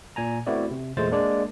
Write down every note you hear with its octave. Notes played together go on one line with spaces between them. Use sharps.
A#2 G#5 A#5
A3 B3 C4 E4 F#4 D5
C3
E2 A#2 G#3 A3 C5 A6
G#3 A#3 D4 D5